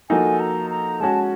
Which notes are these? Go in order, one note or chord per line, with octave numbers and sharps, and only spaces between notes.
F3 A#3 D#4 F#4 A4 G#5
A#5
A#5
G#3 C#4 F#4 A5